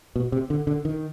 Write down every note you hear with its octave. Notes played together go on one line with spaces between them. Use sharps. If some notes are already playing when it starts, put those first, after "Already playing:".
B2
C3
D3
D3
D#3